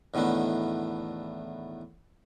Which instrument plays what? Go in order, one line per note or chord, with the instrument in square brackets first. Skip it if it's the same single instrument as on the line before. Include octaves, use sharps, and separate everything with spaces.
[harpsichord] E2 A2 D3 D#3 B3